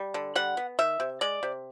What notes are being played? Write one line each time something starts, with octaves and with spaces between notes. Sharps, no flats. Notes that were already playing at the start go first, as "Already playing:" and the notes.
Already playing: G3
D3
G3 F#5
B3
D#3 E5
C3
G#3 D5
C3